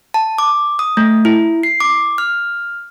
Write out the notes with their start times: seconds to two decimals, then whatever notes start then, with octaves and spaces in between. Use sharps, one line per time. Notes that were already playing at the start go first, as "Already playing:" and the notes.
0.14 A5
0.38 D6
0.79 D#6
0.97 A3
1.25 E4
1.63 C7
1.80 D6
2.18 F6